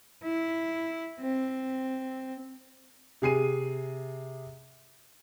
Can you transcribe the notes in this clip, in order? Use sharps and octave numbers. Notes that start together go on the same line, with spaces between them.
E4
C4
C3 G#4 C7 D#7